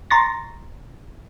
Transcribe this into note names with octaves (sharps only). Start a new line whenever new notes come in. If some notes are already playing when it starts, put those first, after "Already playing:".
A#5 C6 C#6 A6 A#6